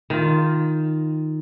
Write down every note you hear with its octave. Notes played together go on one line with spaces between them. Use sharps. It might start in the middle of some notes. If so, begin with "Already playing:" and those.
D#3 F4